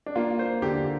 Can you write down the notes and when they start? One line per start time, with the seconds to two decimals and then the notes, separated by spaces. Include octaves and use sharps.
0.06 D4
0.15 A#3 F4
0.39 C5
0.62 D3 G4